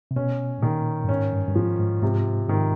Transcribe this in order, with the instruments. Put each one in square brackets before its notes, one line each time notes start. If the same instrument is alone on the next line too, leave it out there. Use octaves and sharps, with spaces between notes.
[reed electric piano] C3
[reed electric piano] B2 [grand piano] C#4
[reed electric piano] A2
[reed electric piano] A#2 [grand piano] D#3
[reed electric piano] G2
[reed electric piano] G#2 [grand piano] C#4
[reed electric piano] G2
G2
[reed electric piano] G#2 [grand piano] F3
[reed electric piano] G#2
[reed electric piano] G#2 [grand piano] C3
[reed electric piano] G#2 [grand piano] D#3